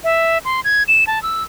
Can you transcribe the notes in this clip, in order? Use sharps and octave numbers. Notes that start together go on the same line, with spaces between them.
E5
C6
G#6
E7
A5
E6